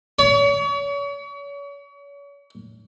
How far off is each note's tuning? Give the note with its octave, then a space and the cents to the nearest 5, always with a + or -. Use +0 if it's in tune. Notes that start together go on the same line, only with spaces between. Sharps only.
C#5 +40